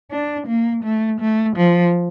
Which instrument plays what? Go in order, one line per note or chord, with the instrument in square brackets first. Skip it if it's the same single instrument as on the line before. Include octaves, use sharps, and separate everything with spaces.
[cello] D4
A#3
A3
A3
F3